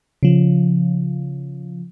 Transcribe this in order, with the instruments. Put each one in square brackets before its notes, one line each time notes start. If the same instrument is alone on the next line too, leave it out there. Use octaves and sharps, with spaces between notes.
[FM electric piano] C#3 F3